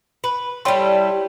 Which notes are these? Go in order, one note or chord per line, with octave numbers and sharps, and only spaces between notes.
B4
G3 E4 A4 C#5 G5 C6